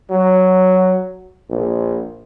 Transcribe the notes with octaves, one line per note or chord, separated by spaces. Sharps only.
F#3
A#1